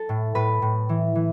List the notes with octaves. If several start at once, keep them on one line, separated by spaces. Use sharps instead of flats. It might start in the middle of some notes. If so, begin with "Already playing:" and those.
Already playing: A4
A2
A2 B4
A2
E3
E3